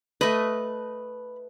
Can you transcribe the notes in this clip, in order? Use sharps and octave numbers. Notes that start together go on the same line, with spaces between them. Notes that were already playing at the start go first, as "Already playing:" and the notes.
A3 B4 D#5